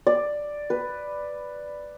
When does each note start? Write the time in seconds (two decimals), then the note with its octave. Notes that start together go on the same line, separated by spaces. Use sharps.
0.07 D5
0.70 B4